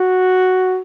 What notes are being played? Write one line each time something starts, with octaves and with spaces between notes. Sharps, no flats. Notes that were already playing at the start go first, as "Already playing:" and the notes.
Already playing: F#4